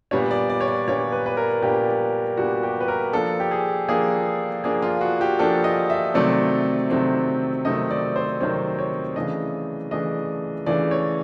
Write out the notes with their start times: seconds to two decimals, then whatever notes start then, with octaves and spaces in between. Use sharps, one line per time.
0.11 A#2 G3 B3 D4 C#5
0.31 D5
0.50 D5
0.61 C#5
0.68 D5
0.87 A#2 G3 B3 D4 C#5
1.12 B4
1.26 B4
1.37 A#4
1.62 A#2 G3 B3 D4 G4
2.37 A#2 G3 B3 D4 F#4
2.63 G4
2.80 B4
2.88 A#4
3.13 F3 A#3 D4 A4
3.40 G4
3.51 G#4
3.88 F3 A#3 D4 G#4
4.64 F3 A#3 D4 G#4
4.82 F4
5.01 F#4
5.21 G4
5.39 F3 A#3 D4 A4
5.64 D#5
5.90 E5
6.14 C3 D#3 F#3 A3 C4 D5
6.90 C3 D#3 F#3 A3 C4
7.65 C3 D#3 F#3 A3 C4 D#5
7.91 D5
8.16 C5
8.40 C3 D#3 F#3 A3 C4 C#5
8.79 C#5
9.16 C#3 E3 A3 D4 D#5
9.91 C#3 E3 A3 D4 D#5
10.66 C#3 E3 A3 D4 D5
10.91 C#5